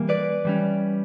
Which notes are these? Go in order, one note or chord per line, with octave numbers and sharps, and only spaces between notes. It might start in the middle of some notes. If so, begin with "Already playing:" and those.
Already playing: E3 G3 A#3
B4 D5
E3 G3 C#4